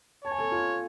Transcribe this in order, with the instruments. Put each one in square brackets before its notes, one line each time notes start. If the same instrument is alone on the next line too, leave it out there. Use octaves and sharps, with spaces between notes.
[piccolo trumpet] C#5 [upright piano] A5
[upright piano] G#5
A4 A5
F4 F5